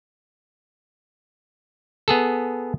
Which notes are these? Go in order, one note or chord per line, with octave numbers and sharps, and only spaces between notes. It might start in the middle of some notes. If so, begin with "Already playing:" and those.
B3 G#4 A4